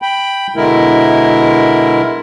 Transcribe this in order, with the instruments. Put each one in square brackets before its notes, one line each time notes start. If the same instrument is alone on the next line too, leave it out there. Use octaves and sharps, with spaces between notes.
[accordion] G5 B5
B2 D3 G#3 E4 A#4